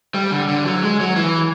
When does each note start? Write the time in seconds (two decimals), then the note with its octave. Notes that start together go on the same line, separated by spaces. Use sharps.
0.15 G3
0.31 D3
0.48 D3
0.65 F#3
0.83 G#3
1.00 F#3
1.16 E3